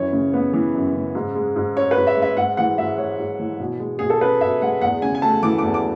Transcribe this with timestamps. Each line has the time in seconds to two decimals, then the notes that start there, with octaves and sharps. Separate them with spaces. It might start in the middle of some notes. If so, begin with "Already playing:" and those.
Already playing: F#2 E3 C#5
0.13 C#3
0.33 B3
0.53 E3
0.75 F#2
0.95 C#3
1.15 G#2
1.35 G#3
1.56 G#2
1.76 C#4 C#5
1.91 B4
1.97 G#2
2.07 E5
2.17 G#3
2.22 E5
2.37 G#2 F#5
2.57 E3 F#5
2.78 G#2 E5
2.98 G#3 C#5
3.19 G#2
3.39 E3
3.60 B2
3.80 G#3
3.99 B2 G#4
4.10 A4
4.20 C#4 B4
4.41 B2 E5
4.62 G#3 F#5
4.81 E2 F#5
5.02 C#3 G#5
5.15 G#5
5.22 A3 A5
5.43 E3 D6
5.58 E2 D6
5.74 D6